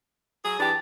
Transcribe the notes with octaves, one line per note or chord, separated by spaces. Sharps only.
F#3 G#4
E3 D4 G4 A5